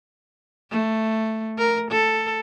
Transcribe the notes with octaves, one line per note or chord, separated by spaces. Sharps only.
A3
A#4
A4